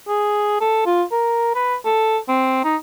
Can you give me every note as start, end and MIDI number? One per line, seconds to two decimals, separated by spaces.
0.08 0.57 68
0.61 0.83 69
0.86 1.03 65
1.12 1.52 70
1.55 1.76 71
1.85 2.18 69
2.28 2.61 60
2.64 2.76 63